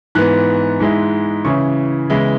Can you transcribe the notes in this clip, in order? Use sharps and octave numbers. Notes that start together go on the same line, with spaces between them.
G#2 E3 B3 F#6
G#2 G#3 E4
C#3 E3 C#4 E4 C#6
C#3 E3 G#3 B3 E4